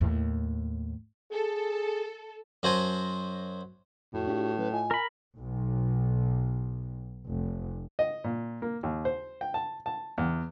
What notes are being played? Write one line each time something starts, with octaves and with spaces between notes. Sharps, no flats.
D#2 A2
G#4 A4
F#2 F#4 C5 G#5 A5
F2 A2 A3 F#4
D4 F4 G4
F#3 C#4 B4
F4 D#5 G#5
A#4 B5
B1
F1
D#5
A#2
A#3
D#2
C5
G5
A5
A5
E2